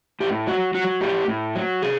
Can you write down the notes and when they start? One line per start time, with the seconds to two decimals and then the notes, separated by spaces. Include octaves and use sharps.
0.20 A2 G4
0.47 F#3 F#4
0.75 F#3 F#4
1.01 A2 G4
1.28 A2
1.55 F#3
1.82 C3 G#4